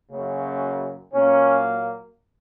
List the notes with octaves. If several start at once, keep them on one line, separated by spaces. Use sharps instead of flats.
F#2 C#3 F#3 A#3
A#2 F#3 A#3 C#4